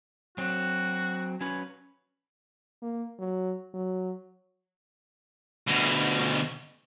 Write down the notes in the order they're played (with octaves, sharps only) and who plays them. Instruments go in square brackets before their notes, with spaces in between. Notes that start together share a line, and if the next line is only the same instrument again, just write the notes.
[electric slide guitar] F#3 C4 [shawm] F#4
[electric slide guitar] F#3 C#4 B4 [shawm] G#5
[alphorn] A#3
F#3
F#3
[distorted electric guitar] D2 B2